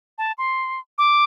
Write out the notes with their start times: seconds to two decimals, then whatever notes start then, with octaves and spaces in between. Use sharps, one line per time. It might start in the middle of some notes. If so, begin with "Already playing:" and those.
0.18 A5
0.38 C6
0.98 D6